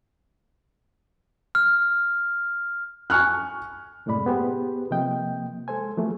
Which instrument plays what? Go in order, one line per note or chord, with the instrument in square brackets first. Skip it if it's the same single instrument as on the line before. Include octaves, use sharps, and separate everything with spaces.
[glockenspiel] F6
[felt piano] G#5 C#6 F6 F#6
[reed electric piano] F#2 A2 C3 G#3 D5 B5
B3 G4 G#4 B4 C5
C3 F3 A#3 D#5 G5
G#3 A4 C5 G#5
F3 F#3 A3 A#3 G#4